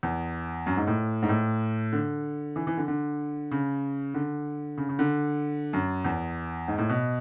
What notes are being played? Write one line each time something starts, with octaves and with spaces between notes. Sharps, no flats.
E2
F#2
G#2
A2
G#2
A2
D3
E3
E3
D3
D3
C#3
D3
C#3
C#3
D3
F#2
E2
G#2
A2
B2